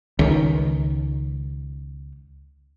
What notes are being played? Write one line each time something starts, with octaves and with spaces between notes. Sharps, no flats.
C#2 D#3